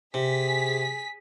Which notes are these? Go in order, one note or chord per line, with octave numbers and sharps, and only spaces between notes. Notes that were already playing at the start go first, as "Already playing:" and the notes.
C3 G#4 B6